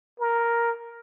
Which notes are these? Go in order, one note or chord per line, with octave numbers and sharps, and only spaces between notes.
A#4